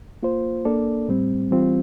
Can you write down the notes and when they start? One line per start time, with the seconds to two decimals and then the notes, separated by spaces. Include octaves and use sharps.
0.23 A#3 F4 C5
0.65 A#3 D4 A4 D5
1.08 A2 G3 C4
1.51 E3 G3 C4 F4